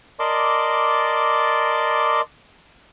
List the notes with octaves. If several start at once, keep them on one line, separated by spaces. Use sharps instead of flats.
A#4 D5 D#5 A5 C6 D6